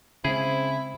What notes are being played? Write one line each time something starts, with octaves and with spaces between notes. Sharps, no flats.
C#3 G#3 C4 E4 G#4